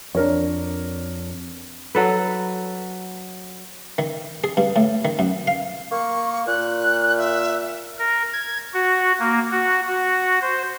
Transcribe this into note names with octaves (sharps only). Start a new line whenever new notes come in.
F2 D4 A#4 C#5
F#3 A4 B4
D#3
G#4
G2
A2
D#3
F#2
F5
A#3 C#6
A#2 F#6
E5
A#4
G#6
F#4
A#3
F#4
F#4
C5